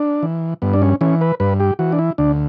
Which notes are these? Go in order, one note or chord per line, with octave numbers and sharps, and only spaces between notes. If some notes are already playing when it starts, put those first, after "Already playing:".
Already playing: D4
E3
G2 B3
D4
C#4
E3 C#4
B4
G2 B4
G4
E3 F#4
D4
E4
D2 D4